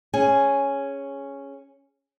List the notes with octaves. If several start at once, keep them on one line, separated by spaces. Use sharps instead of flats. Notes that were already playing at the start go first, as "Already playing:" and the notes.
C#4 G#4 G#5